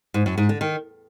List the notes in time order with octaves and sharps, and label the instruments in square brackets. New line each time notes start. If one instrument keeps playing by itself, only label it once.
[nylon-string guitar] G#2
F#2
G#2
D3
D#3